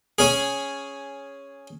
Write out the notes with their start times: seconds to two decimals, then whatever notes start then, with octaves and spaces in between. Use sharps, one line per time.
0.19 C#4 G#4